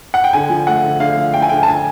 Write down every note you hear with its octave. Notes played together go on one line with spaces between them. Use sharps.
F#5
G5
D3 G#5
F3
A3 F#5
D3
D3 F5
F3
A3 G5
G#5
D3 G5
A5
G#5